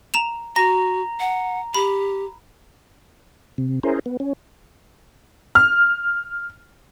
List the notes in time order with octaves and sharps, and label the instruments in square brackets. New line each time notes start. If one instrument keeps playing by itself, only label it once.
[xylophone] A#5 E7 F7
[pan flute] F#4 [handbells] A#5 [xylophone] A#6
[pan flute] F#5
[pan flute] G4 [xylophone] B5
[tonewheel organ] C3
C#4 E4 G#4 A#4 C5
B3
C#4
[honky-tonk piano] F6